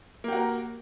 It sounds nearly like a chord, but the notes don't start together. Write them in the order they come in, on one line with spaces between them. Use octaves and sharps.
A#3 G4 F#4 A#4